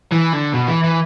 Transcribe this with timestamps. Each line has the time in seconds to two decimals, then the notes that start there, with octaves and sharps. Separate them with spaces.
0.12 E3
0.33 D3
0.54 B2
0.68 E3
0.84 E3